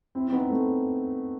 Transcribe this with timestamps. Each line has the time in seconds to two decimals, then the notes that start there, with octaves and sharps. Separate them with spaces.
0.15 C4 E4
0.28 C4
0.33 B3 D#4
0.50 A3 C4